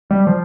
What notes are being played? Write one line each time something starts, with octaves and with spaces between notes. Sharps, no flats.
G3
F3